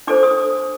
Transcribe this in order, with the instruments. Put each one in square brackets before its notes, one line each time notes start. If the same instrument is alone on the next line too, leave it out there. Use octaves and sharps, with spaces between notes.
[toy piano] D4 A4 C5 D6
D#6